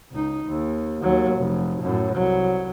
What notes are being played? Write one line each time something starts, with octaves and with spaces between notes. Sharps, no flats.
C#2 D#4
D#2
D#2 F#3
F1
F#2 A2
C2 F#3